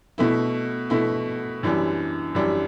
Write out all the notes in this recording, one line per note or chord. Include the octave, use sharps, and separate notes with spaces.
B2 A3 E4
B2 A3 E4
F#2 E3 G3 D4
F#2 E3 G3 D4